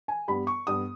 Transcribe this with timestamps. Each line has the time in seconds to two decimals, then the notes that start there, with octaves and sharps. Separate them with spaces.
0.08 G#5
0.28 G2 G3 B3 B5
0.47 C#6
0.67 G2 G3 B3 D#6